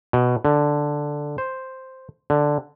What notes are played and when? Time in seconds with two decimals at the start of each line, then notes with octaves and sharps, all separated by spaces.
0.13 B2
0.45 D3
1.38 C5
2.30 D3